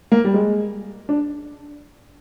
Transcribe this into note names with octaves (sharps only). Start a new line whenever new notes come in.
A#3
G3
G#3
D4